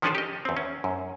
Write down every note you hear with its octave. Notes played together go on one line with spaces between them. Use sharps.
D#3 F3 C#4 D4 G#4 A4
G4 D#5
E2 C4
C#4
F#2